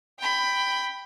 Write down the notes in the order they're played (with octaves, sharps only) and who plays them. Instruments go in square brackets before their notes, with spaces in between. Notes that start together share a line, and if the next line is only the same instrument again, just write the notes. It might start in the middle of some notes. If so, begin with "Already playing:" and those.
[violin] G5 B5